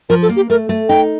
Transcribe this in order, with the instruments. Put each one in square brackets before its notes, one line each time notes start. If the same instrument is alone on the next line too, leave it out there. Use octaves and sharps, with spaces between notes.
[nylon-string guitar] F3 [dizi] A#4
[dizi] A4
[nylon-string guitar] A#3
[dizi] G4
[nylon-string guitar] A3 [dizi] A#4
[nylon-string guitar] A3
[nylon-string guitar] D#4 [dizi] G5